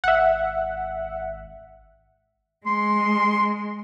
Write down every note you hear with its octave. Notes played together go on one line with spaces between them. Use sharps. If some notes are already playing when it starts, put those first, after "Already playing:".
G#1 E5 F#5
G#3 C6